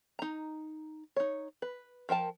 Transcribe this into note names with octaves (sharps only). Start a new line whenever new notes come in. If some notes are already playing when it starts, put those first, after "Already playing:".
D#4 A#5
D#4 C#5
B4
F3 A#4 G5 A5